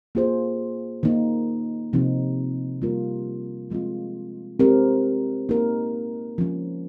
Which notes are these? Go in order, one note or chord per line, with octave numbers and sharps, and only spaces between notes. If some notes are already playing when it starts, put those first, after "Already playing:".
A#3 F4 G#4 C5
D#3 A#3 D#4
C3 F3 C4 D#4
G3 A#3 F4 A#4
F3 G#3 C4 F4
G#3 C4 G4 A#4
A#3 D#4 A#4
F3 G#3 C#4